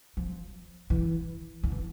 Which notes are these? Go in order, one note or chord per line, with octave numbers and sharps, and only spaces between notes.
F3
E3
D#3
E3